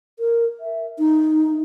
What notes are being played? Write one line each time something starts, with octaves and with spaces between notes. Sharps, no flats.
A#4
E5
D#4